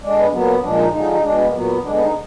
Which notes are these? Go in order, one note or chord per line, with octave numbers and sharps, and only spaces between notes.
D3 G#3 D4
B3
A#2 F#3 B3
A#2 F3 G#3 D4
D#4
D3 F3 G#3 D#4
D#4
B2 G#3 D4
B3
A#3
A#2 F#3 B3
D3 G#3 D4
B3
D#4